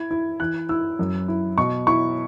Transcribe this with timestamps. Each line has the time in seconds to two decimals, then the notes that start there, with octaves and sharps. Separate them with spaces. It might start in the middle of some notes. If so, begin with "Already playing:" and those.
Already playing: E4 G#6
0.11 E4
0.40 E3 F#6
0.69 E4 E6
0.99 F#2
1.28 E4
1.58 B2 C#6
1.87 E4 C#6